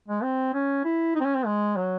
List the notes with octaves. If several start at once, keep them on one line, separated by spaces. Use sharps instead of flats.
G#3
C4
C#4
E4
D#4
C4
C#4
C4
G#3
F#3